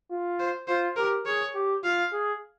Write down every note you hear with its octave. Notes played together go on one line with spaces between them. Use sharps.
F4
C5
F4 C5
G4 A#4
G#4 C#5
G4
F4 F5
G#4